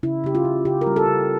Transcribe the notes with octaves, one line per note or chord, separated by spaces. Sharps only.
C#3 E4
C#3 G4
F4
C#3
C#3 G4
A#4
G3
A4
C#3